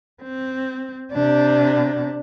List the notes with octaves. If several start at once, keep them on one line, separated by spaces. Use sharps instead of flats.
C4
C3 D4